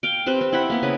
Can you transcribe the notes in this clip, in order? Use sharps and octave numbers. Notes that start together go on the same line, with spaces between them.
F5 G5
C4 G4 B4 C5
C4
E4 F#5 B5
A#3 B3
C#3 B4